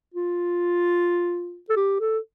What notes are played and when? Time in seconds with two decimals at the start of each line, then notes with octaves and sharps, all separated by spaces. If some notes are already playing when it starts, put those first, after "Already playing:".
0.14 F4
1.69 A4
1.76 G4
2.00 A4